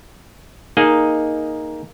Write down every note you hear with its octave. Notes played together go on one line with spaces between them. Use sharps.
A#3 D#4 G#4 D#5